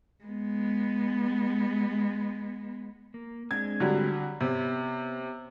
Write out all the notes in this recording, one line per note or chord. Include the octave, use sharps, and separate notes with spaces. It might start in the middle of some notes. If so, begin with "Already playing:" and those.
G#3 B3
A#3
G#3 C4 D4 G#6
D3 F#3 G3
C3 B3 C#5